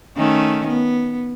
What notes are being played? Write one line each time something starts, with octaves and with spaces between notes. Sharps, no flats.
D#3 A3 C#4
B3